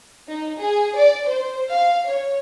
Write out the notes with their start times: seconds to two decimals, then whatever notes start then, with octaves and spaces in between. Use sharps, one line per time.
0.28 D#4
0.60 G#4
0.96 D5
1.27 C5
1.71 F5
2.07 C#5